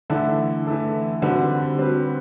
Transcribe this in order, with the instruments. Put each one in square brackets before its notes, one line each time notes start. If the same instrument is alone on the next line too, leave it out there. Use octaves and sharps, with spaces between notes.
[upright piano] D3 [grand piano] E3 A3 E4 A4
[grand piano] E3 A3 E4 A4
[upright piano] D3 [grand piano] G3 C4 F#4 B4
[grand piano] G3 C4 F#4 B4